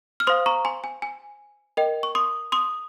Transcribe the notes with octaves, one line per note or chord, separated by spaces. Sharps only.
F6
C5 F5 C6 D#6
A#5 C#6
G#5 C6
G#5
G#5
A#4 D#5 G5
C#6
C6 D#6
C6 D#6